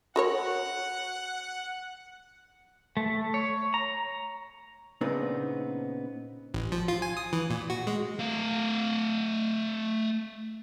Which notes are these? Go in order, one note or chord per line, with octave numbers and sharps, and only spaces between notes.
F#4 A#4 C#5 F#5
A3
C#5
A#5
A#2 C#3 B3 C4 D4 D#4
A1
F3
F4
G#5
D#6
E3
A#2
F#4
G#3
A3 F5